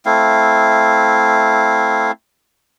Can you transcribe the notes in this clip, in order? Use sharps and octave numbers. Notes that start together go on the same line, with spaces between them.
A3 C4 E4 F5